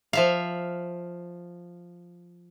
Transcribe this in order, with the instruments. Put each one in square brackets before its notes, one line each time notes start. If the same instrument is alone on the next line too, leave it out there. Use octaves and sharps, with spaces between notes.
[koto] F3 E5 F5